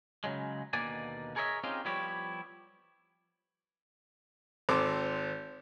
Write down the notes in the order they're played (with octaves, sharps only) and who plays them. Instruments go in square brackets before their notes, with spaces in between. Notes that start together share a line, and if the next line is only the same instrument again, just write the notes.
[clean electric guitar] C#3 F#3 G#3
D#2 B2 D3 A#3 D5 G#5
G#4 A#4 C#5 D#5 E5
C4 C#4 D#4 F4 G4 G#4
F3 G3 B3 E4 G4 C#5
[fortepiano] G#1 C4 A4 D6